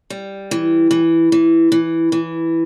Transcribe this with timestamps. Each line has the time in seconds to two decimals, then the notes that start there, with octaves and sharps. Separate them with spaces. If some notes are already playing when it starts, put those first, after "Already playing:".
0.10 G3
0.51 E3
0.91 E3
1.32 E3
1.72 E3
2.12 E3